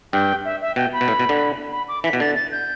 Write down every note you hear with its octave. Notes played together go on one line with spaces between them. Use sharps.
G2 G5
E5
E5
B2 G5
B5
B2
A2
B2
D3
B5
D6
E3 B6
B2
D3 A6
A6
G6